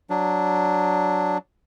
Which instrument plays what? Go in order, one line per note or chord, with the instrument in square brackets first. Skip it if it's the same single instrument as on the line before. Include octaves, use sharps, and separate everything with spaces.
[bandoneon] F#3 D4